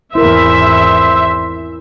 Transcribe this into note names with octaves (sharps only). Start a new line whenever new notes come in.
G#1 E2 E4 A#4 C5 E5